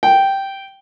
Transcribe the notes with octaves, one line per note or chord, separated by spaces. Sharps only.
G5